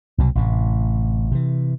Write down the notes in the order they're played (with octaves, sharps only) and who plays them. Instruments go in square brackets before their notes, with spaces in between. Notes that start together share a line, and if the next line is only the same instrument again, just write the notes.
[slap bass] C2 B2 F#3
A1 A2 C3
C3 E3